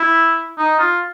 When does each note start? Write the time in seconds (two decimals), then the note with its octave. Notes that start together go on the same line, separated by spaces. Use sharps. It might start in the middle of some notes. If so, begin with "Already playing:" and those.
Already playing: E4
0.58 D#4
0.79 F4